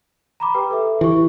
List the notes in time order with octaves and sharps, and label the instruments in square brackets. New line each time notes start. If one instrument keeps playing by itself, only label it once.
[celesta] A#5 B5 D6
G4 B4 G5
A4 E5
[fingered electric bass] E3 [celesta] G4 C#6